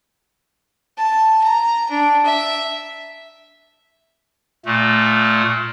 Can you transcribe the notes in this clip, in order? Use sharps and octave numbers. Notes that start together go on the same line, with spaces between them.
A5
A#5
D4
E5
A#2 A3